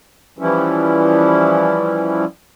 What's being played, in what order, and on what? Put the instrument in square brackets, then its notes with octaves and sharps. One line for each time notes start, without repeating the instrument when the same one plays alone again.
[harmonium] E3 F3 G3 C#4 E4